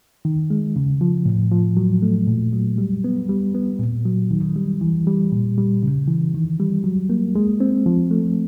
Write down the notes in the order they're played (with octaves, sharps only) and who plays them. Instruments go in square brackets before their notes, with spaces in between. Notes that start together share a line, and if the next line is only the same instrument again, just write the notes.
[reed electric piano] D#3
G#3
C#3
F3
A2
F3
F#3
A3
A#2
F#3
G3
B3
G3
B3
A#2
F#3
D#3
G3
E3
G3
A#2
G3
C#3
E3
D#3
G3
F#3
A#3
G#3
C4
F3
A3